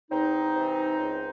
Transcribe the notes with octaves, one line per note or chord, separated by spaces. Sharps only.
E2 C4 D#4
C3 E3
C#2